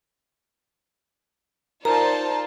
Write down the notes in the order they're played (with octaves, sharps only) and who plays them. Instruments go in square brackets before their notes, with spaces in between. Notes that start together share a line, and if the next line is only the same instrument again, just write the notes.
[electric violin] D#4 A5 [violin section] F4 C5 D5 [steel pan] A#4 [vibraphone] A#5